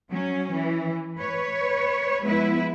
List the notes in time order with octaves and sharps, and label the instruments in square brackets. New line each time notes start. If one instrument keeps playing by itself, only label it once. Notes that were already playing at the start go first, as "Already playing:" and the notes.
[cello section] F#3 C#4
E3
B4 C#5
F3 G#3 B3 E4 B4